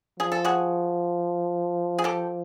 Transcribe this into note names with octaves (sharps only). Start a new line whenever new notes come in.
F3 G#4
A4
F#4 G#4
G#4
G4 A4